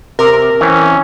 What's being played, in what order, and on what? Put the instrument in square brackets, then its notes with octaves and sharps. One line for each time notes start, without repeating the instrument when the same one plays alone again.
[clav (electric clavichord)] C3 [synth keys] A#4
[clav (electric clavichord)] E3 C4 [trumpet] C#4